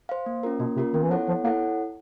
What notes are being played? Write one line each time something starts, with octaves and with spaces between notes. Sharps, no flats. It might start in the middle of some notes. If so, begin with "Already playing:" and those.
C5 F5
A#3
C#4 F4 A#4
B2 A#3
C3 C#4 F4 A#4
D#3 B3
E3
F3 E4 A4 C#5 F#5
F3 B3
A#3 E4 A4 C#5 F#5